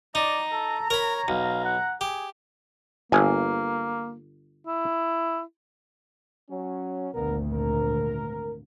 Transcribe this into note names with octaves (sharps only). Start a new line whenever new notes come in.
D#4 D5 A#5
A4
A#4 C#5 B5
B1 F5
F#5
G4 G#4
G1 A#3 G#5
E4
F#3 C#4
G#1 D2 G2 A#2 B3 A#4
A#4